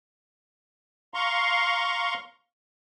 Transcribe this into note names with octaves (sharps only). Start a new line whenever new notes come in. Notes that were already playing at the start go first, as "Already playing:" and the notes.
F5 A#5 C6 C#6